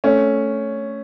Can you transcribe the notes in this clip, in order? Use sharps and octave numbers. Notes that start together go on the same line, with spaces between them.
A3 C#4